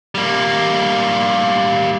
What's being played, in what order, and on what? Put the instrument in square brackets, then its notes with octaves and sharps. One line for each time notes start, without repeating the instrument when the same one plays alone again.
[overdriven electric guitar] G3 A#3